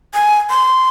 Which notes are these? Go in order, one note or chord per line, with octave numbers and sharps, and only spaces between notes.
G#5
C6